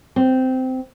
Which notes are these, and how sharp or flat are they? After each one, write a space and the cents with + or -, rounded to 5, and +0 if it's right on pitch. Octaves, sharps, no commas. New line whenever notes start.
C4 -15